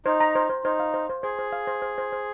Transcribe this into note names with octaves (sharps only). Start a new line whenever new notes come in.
D#4 C5
A#5
C5
C5
D#4 C5
F5
C5
C5
G#4 C5
C5
F5
C5
C5
C5
C5